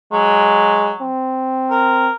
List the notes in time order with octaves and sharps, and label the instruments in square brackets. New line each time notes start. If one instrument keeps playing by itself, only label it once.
[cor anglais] F#3 [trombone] G#3
[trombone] C4
[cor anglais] A#4